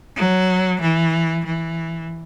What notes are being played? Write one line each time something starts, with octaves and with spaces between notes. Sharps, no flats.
F#3
E3
E3